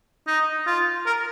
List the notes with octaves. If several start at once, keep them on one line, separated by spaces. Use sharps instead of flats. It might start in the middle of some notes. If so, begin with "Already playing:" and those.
D#4
F4
A#4